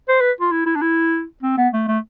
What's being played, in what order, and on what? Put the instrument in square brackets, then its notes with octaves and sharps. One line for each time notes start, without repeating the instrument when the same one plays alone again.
[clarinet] C5
B4
F4
E4
E4
D4
E4
C4
B3
A3
A3